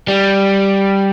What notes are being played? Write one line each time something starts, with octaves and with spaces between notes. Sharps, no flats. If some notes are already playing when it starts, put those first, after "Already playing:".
G3